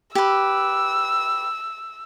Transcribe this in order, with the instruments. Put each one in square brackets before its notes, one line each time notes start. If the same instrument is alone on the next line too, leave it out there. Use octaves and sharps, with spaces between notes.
[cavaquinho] G4 B4 [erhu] E6